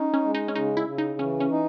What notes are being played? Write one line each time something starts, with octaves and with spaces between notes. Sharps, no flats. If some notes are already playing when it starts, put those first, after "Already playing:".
Already playing: C#4 D#4
C#4
G#3
D#4
C#4
C#3 D#4
E4
C#3
D#4
E3 C#4
C#4
D#4